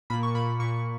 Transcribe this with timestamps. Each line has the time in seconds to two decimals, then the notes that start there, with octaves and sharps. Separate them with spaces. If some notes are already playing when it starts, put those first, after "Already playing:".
0.10 A#2 B5
0.23 C#6
0.35 A#2 B5
0.60 A#2 C#6